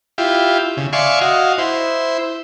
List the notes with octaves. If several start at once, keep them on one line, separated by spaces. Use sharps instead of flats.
E4 F4 G4
C#3
D5 E5 F5 G#5 C6 C#6
F#4 D#5 F5
E4 C5